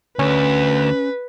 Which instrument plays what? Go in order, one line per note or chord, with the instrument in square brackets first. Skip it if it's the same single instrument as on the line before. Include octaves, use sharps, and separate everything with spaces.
[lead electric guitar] D2 [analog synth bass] C#4 [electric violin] B4